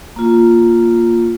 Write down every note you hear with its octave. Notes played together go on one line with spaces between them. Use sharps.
A#3 F4